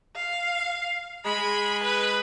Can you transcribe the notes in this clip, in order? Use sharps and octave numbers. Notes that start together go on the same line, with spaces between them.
F5
G#3 B5
B4